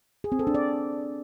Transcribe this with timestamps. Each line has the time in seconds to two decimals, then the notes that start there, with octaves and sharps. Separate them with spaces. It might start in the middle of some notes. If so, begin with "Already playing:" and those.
0.24 G#4
0.32 C4
0.39 A4
0.47 D4
0.55 D5